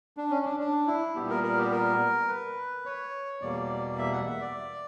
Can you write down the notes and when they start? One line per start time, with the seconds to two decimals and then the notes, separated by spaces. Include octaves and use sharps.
0.17 D4
0.31 C#4
0.45 D4
0.60 D4
0.87 E4
1.15 A#2 G3 B3 G4
1.30 A#4
1.44 A#4
1.58 G4
1.72 A#4
2.28 B4
2.86 C#5
3.42 E2 B2 G3 A#3 D5
3.98 E5
4.12 F#5
4.27 E5
4.41 D5